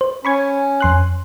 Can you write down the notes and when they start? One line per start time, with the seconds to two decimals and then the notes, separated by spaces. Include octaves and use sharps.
0.01 C5
0.25 C#4 B5 C#6 G#6
0.80 F2 C6 F#6